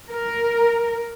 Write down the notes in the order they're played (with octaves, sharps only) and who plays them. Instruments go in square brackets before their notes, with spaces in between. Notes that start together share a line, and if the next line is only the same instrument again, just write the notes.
[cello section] A#4